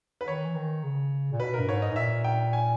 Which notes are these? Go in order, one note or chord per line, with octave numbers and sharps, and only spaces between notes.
B4
D#3 C#5
E3
D#3
C#3
A#2
B2 B4
A#4
G2
G#2 C#5
D#5
G#2
A#2 E5
G5
G#5